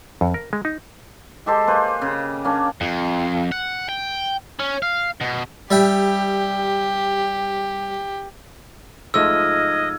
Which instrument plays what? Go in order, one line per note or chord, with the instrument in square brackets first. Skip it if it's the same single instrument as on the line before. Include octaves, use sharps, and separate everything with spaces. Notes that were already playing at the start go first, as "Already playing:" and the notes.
[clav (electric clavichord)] F2
A#4
G#3
D#4
[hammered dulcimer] G#3 G4 A4 C5
A#3 B4 C5
C#3
A#3 C#4 D4
[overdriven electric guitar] F2
F#5
G5
C#4
F5
B2
[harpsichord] G3 E5 G5 [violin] G4
[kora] G#2 F3 A3 [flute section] D#4 F6 G#6 [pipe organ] D#5 [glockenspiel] E6